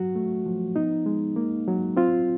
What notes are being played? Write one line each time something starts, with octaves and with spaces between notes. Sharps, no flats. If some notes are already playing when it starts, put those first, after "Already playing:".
Already playing: F#3 F#4
A3
F3
B3 D#4
G#3
A#3
F#3
C4 F4